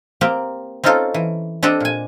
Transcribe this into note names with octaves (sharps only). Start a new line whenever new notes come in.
A#3 C4 G4
C4 C#4 D#4 F4 A4 C5
E3
C4 D4 G4 A4 D#5
A#2 G#5